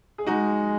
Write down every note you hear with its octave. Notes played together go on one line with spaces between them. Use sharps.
G#4
G#3 D#4 F#4